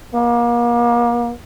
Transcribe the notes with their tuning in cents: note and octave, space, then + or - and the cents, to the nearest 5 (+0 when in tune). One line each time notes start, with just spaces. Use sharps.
A#3 +35